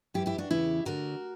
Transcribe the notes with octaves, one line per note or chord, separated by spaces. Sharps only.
F#2 E3 E4 G4
E4 G4
D4 F#4
E2 C#3 E3 E4 G4
D2 D3 F#4 A#4